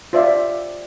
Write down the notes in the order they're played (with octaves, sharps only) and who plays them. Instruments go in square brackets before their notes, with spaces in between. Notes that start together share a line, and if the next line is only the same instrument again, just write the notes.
[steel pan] F4 C5 D5 E5 F5